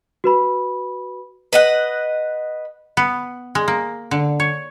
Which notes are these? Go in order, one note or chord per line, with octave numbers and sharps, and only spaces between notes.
F#4 B4 B5
B4 D#5 F#5
B3
G#3
A#3
D3
C#5